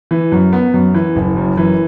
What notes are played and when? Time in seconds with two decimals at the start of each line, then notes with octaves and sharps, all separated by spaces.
0.11 E3
0.32 F#2
0.53 B3
0.74 F#2
0.94 E3
1.16 F#1
1.37 F#2
1.57 E3